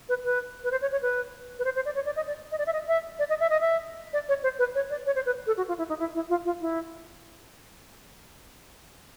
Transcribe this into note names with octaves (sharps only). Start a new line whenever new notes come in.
B4
B4
B4
C5
C#5
C#5
B4
B4
C5
C5
D5
C#5
D5
D#5
D5
D#5
D5
E5
D#5
E5
D5
D#5
E5
D#5
E5
D5
C#5
C5
B4
C#5
D5
C#5
C5
B4
A4
F#4
F4
E4
D#4
E4
E4
F4
F4
E4